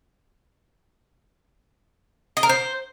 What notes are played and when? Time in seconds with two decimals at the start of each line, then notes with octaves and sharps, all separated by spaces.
2.37 D#5
2.43 A#4
2.49 C5